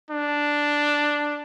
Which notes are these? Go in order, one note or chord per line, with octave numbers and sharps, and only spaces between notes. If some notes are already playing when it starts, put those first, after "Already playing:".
D4